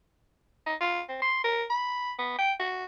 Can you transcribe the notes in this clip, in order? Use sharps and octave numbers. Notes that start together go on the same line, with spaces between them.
D#4
F4
C4
C6
A#4
B5
B3
G5
F#4